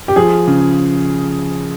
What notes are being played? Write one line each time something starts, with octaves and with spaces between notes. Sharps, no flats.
G4
F3 G#4
C#3